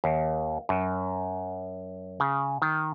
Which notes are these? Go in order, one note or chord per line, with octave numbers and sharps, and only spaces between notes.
D#2
F#2
C#3
D#3